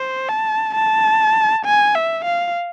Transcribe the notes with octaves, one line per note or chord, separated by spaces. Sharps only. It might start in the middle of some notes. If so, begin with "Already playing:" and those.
Already playing: C5
A5
A5
G#5
E5
F5